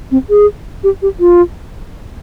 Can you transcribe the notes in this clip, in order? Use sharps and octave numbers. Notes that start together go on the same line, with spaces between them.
C4
G#4
G4
G4
F4